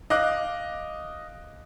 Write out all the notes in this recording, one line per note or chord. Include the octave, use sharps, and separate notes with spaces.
D#5 F5 D6 F#6